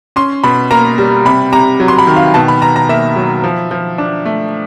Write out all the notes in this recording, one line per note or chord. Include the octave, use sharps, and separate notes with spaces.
C#4 C6
B2 B5
A#3 A#5
G3
C3 B5
C3 A#5
F#3
C6
B5
D#3
F5
B2 A5
B5
B2 A#5
A#5
A#3 E5
F#3
F3
F3
D4
A3